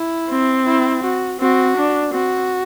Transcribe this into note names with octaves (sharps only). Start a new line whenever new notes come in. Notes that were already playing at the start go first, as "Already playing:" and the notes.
Already playing: E4
C4
E4
F#4
C4 F#4
D4
C4 F#4